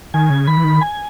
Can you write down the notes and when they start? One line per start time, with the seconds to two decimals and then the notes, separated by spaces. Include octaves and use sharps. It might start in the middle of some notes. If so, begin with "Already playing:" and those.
0.14 D#3 G#5
0.30 C#3
0.47 D#3 B5
0.57 E3
0.64 D#3
0.81 G#5